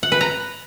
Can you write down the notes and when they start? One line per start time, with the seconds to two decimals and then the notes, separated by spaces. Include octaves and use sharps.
0.03 F#5
0.12 B4
0.21 A#5